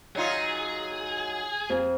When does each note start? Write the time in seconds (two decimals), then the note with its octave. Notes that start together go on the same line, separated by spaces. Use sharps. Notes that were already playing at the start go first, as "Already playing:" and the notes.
0.15 F#3 D#4 F4 G#4
1.70 F2